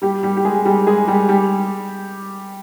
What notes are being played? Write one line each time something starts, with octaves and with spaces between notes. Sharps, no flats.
G3 G4
G3 G4
G4
G#3 G#4
G3 G4
G#3 G#4
G3 G4
G3 G4